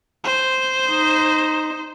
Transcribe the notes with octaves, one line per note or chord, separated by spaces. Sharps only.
C5
D#4